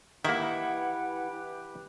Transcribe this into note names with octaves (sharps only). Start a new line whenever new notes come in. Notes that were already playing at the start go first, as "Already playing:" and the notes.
D#3 E3 A#3 E4 G4 B4 F#5